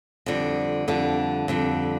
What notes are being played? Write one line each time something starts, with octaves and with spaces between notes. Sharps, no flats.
F2 D3 G3
F2 D3 G3
F2 D3 G3